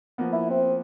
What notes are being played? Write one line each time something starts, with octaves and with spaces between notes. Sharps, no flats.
F3 A#3 B3
E4
C4